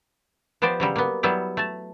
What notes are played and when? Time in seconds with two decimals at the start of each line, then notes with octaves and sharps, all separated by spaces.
0.62 F3 B3 G4 C5 D5
0.80 C#3 F#3 G3
0.96 A#3 B3
1.23 F#3 G3 B3 E4
1.57 A3 A5